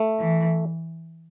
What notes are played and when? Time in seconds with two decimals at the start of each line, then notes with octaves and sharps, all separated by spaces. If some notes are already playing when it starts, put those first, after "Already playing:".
Already playing: A3
0.20 E3